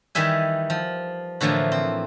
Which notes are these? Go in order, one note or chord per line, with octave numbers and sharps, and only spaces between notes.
D#3 E3 G3 E5 G#5
F3
A2 D3 E3 F3 A#3
C4